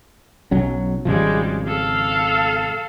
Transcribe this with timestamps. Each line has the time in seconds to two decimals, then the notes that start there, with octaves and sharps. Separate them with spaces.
0.51 B1 F#3 C#4
1.05 G#1 C#3 F3 G3 G#3
1.67 A4 F5